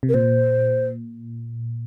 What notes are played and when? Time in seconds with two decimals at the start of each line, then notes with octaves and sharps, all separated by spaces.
0.03 C3
0.09 A#4
0.14 A#2 C5